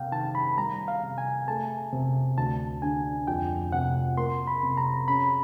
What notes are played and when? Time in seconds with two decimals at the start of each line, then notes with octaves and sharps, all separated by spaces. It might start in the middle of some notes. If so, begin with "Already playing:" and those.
Already playing: C3 A#3 F5 G5
0.12 D#3 A5
0.35 B5
0.57 G3 A#5
0.88 F5
1.03 C3
1.18 G#5
1.48 A3 A5
1.93 C3
2.38 D2 A5
2.82 D3 G#5
3.28 F2 G5
3.72 C3 F#5
4.17 A#3 C6
4.47 B5
4.63 C3
4.77 A#5
5.08 C#4 B5